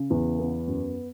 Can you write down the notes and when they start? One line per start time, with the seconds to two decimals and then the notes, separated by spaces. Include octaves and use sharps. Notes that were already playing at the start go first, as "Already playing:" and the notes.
Already playing: C#3
0.10 E2
0.39 B3
0.68 F#2